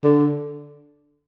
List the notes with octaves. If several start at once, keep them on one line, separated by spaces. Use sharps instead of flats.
D3